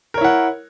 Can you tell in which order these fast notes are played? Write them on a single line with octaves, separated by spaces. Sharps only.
A#4 C#5 E4 F#5